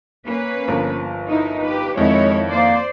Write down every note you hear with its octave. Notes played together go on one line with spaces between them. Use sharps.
A#3 C#4 B4
G1 F3 A#4
D#4 E4
G4 B4
F2 D#3 G#3 E4 C#5
A#3 C5 D5